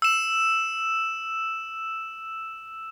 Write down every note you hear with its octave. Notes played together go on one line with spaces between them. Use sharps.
E6 E7